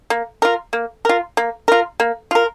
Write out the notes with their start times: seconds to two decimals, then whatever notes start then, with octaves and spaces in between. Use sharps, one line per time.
0.10 A#3
0.42 F4 A#4
0.73 A#3
1.05 F4 A#4
1.37 A#3
1.68 F4 A#4
2.00 A#3
2.31 F4 A#4